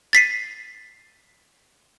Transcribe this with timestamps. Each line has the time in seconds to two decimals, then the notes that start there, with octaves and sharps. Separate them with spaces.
0.13 A6 B6 C7 D#7